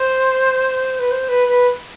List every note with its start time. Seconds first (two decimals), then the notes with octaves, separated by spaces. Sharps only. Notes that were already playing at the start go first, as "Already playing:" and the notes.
Already playing: C5
0.99 B4
1.11 C5
1.28 B4
1.48 B4